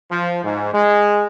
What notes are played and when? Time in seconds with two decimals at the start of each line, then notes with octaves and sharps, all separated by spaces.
0.11 F3
0.44 G#2
0.72 G#3